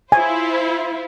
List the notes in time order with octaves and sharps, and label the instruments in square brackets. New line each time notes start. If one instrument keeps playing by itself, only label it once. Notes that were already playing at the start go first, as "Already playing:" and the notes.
[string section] E4 F4 C5 [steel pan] G#5